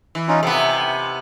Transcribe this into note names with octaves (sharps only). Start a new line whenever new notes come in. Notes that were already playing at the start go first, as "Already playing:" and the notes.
E3
C#4 D#4 F4
C3 B3 A4
G#5